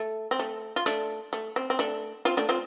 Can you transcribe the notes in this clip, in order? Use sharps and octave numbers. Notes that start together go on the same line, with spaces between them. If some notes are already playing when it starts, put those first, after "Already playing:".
Already playing: A3
C4
A3
F4
A3 D4
A3
C4
C4
A3 D4
C4 F4
A3 D4
C4 F4